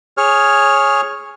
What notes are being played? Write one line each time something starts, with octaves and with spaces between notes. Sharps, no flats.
G#4 C#5 F6